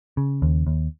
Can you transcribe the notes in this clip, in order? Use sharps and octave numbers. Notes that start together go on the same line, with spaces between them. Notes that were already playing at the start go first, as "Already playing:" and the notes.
C#3
D#2
D#2